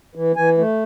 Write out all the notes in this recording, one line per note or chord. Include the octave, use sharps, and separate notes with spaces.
E3
E3 G#5
A3